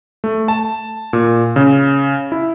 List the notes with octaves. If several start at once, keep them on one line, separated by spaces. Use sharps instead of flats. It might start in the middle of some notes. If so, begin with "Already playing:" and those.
A3
A5
A#2
C#3
E4